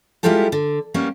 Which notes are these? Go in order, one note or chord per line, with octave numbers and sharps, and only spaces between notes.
G3 G#3 E4 F4 G4 A4
D3
G3 A#3 B3 C#4